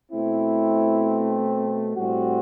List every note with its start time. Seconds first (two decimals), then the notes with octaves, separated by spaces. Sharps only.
0.12 B2 A3 C4 E4
1.95 A2 G3 C4 F#4